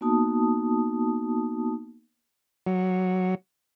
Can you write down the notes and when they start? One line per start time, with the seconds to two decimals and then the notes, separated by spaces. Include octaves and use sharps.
0.01 A#3 B3 D#4 F#4 A5 D#6
2.67 F#3